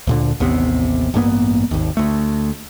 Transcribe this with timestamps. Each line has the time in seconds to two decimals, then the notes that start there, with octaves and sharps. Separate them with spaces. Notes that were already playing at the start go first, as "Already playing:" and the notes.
0.07 D2 A#2 D3
0.40 A1 D#2 C3 B3
1.14 A1 G2 A#3 B3
1.71 G#1 D#2
1.97 D2 A3